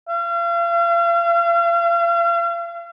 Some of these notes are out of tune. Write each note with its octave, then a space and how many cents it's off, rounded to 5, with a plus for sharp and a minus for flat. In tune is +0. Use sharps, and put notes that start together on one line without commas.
F5 -40